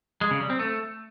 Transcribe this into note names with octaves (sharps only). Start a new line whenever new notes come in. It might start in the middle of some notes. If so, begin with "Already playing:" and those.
G#3
C#3
G3
C4
A3